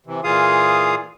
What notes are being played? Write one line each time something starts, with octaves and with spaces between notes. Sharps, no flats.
C3 E3
A#2 E3 F4 G#4 F5 D#6